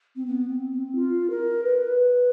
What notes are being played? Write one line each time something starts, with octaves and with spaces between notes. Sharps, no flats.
C4
B3
C4
C4
F4
A#4
B4